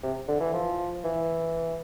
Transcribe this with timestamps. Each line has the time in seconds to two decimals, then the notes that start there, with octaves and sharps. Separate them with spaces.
0.03 C3
0.28 D3
0.40 E3
0.54 F3
1.04 E3